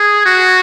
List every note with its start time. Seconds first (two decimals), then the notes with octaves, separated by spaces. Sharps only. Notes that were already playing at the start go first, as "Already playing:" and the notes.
Already playing: G#4
0.26 F#4